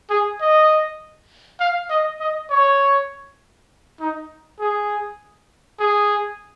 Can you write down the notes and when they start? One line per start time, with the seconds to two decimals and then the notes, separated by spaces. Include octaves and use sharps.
0.10 G#4
0.41 D#5
1.60 F5
1.90 D#5
2.20 D#5
2.51 C#5
4.00 D#4
4.60 G#4
5.80 G#4